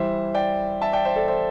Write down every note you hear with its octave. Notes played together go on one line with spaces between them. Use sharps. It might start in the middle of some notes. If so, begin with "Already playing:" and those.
Already playing: E3 G3 E4 C5 E5
D5 G5
E5 A5
D5 G5
C5 E5
A4 D5
C5 E5